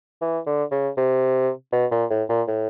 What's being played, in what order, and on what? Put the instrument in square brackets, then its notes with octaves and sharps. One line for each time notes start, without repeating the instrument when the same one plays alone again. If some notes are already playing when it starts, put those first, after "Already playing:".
[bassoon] E3
D3
C#3
C3
B2
A#2
A2
A#2
A2